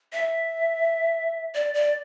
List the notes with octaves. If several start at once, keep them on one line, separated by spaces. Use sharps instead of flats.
E5
D5
D5